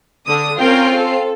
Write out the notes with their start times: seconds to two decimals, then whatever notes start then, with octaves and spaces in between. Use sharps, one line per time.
0.27 D3 D#6
0.59 C4 C#4 F4 A#4 G5 C7
0.94 A4